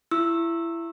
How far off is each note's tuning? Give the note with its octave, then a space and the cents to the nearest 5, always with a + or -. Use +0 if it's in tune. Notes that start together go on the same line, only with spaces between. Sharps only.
E4 +25 C#6 -35 E6 +0